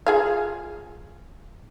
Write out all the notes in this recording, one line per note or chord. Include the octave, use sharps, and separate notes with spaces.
F4 G#4 F5